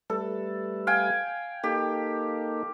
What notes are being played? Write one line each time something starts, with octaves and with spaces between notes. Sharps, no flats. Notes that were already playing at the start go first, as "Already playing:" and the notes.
G3 A3 A4 B4
F5 G5 G#5
A#3 D#4 G4 A4